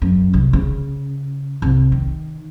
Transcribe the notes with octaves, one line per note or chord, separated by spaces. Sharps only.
F#2
C2
C#3
C2
D#3